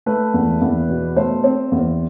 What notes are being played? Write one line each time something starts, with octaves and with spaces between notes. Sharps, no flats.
A3 B4
E2
E2
B2
A3 C5
C4
E2